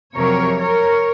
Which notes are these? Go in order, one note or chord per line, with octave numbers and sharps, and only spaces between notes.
F2 C3 F#3 A#4 C#5
A#4 C#5